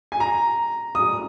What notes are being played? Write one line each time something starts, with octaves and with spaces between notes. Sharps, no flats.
G#5
A#5
D#6